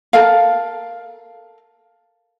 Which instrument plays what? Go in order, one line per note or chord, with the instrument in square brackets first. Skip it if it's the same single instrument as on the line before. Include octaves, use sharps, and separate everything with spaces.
[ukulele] A4 A#4 F5